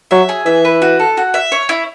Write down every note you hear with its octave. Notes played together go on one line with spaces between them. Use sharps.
F#3 E5
G#4
E3 E5
B4
F#4
A4
F#4
E5
C#5
E4